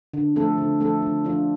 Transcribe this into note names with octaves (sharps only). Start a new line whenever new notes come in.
D3
F3 A3 C4 A4
D3
F3 A3 C4 A4
D3
F3 D4 F4